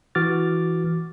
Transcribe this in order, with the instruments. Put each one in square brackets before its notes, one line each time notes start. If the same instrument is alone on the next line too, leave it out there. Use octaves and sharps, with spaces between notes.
[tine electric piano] E3 F#4 D6 F6 A6